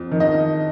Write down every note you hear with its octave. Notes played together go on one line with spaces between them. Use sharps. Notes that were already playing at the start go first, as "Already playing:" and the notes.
Already playing: F2
D#3
D#5